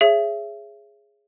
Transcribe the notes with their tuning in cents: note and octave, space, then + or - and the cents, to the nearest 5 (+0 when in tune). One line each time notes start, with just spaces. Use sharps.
G#4 +0 C#5 +0 E5 +30